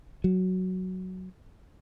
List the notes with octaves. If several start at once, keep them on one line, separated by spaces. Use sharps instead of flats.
F#3